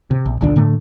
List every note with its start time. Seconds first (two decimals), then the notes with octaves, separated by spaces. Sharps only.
0.11 C3
0.26 A#1
0.41 D1 A#1 D3 D4
0.56 A2 D3 A3